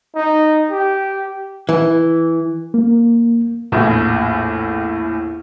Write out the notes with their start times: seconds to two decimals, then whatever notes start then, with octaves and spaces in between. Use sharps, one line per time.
0.16 D#4
0.71 G4
1.69 E3
2.74 A#3
3.72 A#1 E2 A2